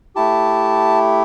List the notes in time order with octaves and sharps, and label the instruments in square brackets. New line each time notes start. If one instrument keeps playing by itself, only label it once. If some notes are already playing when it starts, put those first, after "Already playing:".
[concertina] A3 E4 G4 A5